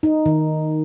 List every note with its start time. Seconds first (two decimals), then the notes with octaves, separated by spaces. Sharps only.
0.03 D#4
0.26 D#3